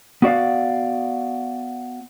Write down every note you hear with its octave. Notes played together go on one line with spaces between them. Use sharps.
B3 F#4 D5 F5